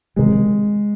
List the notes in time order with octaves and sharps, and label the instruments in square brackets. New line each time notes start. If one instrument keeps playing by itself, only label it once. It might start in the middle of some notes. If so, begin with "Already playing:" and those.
[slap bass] C3 D#3 F#3 [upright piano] G#3